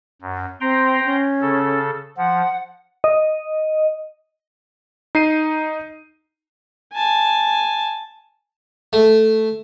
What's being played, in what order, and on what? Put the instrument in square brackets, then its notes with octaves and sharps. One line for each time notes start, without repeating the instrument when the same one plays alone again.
[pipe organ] F#2
[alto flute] C4 [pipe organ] G5 A#5 C6
[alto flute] C#4
[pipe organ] C#3 A4
[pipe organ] F3 [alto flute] F#5
[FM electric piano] D#5
[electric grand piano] D#4 C7 D#7
[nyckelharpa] G#5 A5
[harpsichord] A3